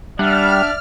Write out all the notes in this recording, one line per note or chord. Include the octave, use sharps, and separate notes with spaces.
G3 D4 D5 E5 F#5 F6